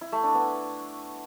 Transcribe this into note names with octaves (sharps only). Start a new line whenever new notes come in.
E4
A3
D4
B3